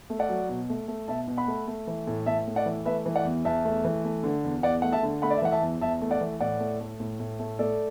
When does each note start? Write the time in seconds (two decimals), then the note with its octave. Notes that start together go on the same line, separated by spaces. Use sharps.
0.10 A3
0.19 D5 F#5
0.29 F#3
0.49 B2
0.70 A3
0.88 A3
1.08 B2 E5 A5
1.28 B2
1.37 F#5 B5
1.48 A3
1.68 A3
1.87 E3
2.07 A2
2.26 A2 E5 A5
2.47 A3
2.56 D5 F#5
2.66 E3
2.85 A3 B4 E5
3.06 E3
3.15 D5 F#5
3.25 E2
3.45 E2 E5 A5
3.65 A3
3.84 E3
4.05 A3
4.23 D3
4.44 E2
4.63 E2 D5 F#5
4.82 A3 F#5
4.92 E5 A5
5.03 D3
5.22 A3 F#5 B5
5.30 D5
5.37 E5
5.42 E3 F#5
5.52 E5 A5
5.62 E2
5.81 E2 E5 A5
6.02 A3
6.11 D5 F#5
6.21 E3
6.40 A2 D5 F#5
6.60 A3
6.80 A3
7.00 A2
7.20 A2
7.39 A3
7.59 A3 A4 D5